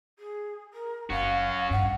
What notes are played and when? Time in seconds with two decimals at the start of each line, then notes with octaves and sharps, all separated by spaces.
0.18 G#4
0.73 A#4
1.10 F#1 C#4 F#4 F5
1.70 A1 G2 F#5